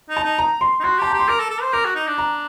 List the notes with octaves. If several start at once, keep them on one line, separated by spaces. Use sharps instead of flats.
D#4
A5
D#4
A#5
C6
D#4
F#4 C6
G4 A5
G4 A#5
C6
A#4 D6
A4
A4
C5
A#4 D6
F#4
D#4
D4
A#5